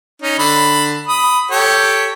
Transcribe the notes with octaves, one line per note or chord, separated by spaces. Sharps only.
C#4 D#4
D3 B5
B5 D#6
G4 A4 C#5